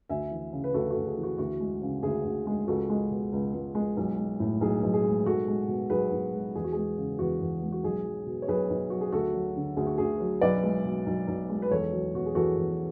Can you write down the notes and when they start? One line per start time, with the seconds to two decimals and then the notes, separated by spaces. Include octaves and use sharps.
0.09 D2 E5 G#5
0.31 E3
0.53 C#3
0.64 B4
0.74 D2 F#4 A4
0.90 F#4 A4
0.96 D2
1.07 G#4
1.17 E3
1.23 F#4
1.38 D2 F#4
1.60 G#3
1.82 C#3
2.03 D2 G#4
2.25 D2
2.47 G#3
2.67 C#2 F#4 A4
2.89 G#3
3.11 B2
3.33 C#2
3.54 C#2
3.75 G#3
3.97 B1
4.18 G#3
4.40 A2
4.61 B1 G#4
4.83 B1
4.94 G#4
5.04 G#3
5.26 B1 F#4 A4
5.48 G#3
5.68 B2
5.90 B1 G#4 B4
6.12 B1
6.34 G#3
6.55 E2 G#4
6.64 F#4
6.73 G#3 G#4
6.98 C#3
7.19 E2 F#4
7.41 E2
7.63 G#3
7.72 F#4
7.83 B1 G#4
8.05 F#3
8.26 B2
8.42 C#5
8.48 B1 G#4 B4
8.70 B1
8.90 F#3 F#4
9.01 G#4
9.12 D2 F#4 A4
9.34 F#3
9.56 D3
9.77 D2 G#4
9.87 F#4
9.98 D2 G#4
10.20 F#3
10.41 B1 B4 D5
10.63 G#3
10.85 B2
11.06 B1
11.28 B1
11.49 G#3
11.62 B4
11.71 E2 A4 C#5
11.92 F#3
12.14 B2 F#4
12.26 G#4
12.35 E2 F#4 A4
12.56 E2